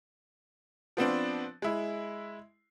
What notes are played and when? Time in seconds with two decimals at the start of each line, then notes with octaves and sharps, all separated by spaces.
0.97 F3 B3 C4 D4
1.62 G#3 E4